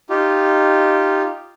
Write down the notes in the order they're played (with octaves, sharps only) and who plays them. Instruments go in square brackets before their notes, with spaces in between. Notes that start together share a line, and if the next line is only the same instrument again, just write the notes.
[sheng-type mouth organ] D#4 F4 G4